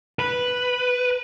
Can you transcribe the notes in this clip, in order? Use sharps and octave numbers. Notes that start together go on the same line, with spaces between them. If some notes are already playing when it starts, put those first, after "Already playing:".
B4